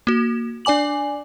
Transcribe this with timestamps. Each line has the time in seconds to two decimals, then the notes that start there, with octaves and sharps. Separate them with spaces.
0.07 A#3 F#4
0.65 D4 D5 G#5 D6 F#7